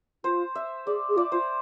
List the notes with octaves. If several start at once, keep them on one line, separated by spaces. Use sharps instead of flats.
F4 C5
E5
G#4 D5
G#4
F4 D5
F4 C5